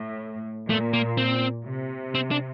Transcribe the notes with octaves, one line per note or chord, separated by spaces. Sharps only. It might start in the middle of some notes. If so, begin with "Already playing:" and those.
Already playing: A2
A#2 A3
A#3
C4
C3
C4
D4